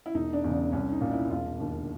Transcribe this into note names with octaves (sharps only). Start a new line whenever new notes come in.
E4
E1 D#4
D4
E2 C#3
D4
C2 C#4
D#4
A#2
E4
E1 F4
D#2 D3